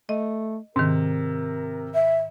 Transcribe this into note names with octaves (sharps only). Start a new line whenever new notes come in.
A3 D#5
G#2 C3 D#3 A#4
E5